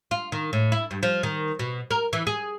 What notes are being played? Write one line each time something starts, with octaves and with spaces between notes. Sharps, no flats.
F4
D#3
A2
E4
G2
F3
D#3
B2
A#4
E3
G#4